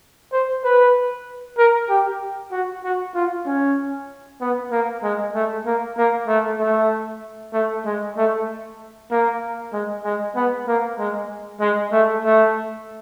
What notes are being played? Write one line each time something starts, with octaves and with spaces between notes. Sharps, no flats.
C5
B4
A#4
G4
F#4
F#4
F4
C#4
B3
A#3
G#3
A3
A#3
A#3
A3
A3
A3
G#3
A3
A#3
G#3
G#3
B3
A#3
G#3
G#3
A3
A3